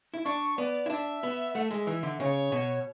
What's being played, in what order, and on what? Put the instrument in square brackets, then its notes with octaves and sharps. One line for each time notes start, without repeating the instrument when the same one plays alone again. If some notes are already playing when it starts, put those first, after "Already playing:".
[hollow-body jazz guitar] E4
[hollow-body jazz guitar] D4 [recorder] C#6
[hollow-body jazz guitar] B3 [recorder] D5
[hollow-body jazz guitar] E4
[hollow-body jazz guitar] D4 [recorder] E5
[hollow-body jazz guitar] B3
[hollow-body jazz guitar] A3 [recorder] E5 F#5
[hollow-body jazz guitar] G#3
E3
D3
[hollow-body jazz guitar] C#3 [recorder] C#5
[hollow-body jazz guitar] B2